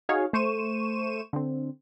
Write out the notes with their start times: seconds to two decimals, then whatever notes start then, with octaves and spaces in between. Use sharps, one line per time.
0.09 D#4 F#4 G#4 C#5 F5
0.33 A3 C5 C#6 D#7 E7
1.33 D3 C4